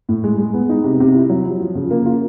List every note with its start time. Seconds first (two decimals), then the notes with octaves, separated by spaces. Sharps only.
0.09 A2
0.24 G#3
0.38 G#3
0.53 B3
0.69 D#4
0.84 C3
1.00 C3
1.15 E4
1.30 F#3
1.45 F3
1.60 F3
1.75 C#3
1.91 A#3
2.06 F4